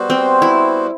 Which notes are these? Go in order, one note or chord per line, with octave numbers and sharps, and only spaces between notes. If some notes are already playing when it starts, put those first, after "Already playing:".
Already playing: G3 B3 F#4 C5
C4
E4